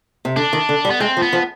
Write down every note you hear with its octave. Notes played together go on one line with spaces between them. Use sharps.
C3
D3 D4
D#3
D3
G3
B3
G#3 C4
F3
B3
F3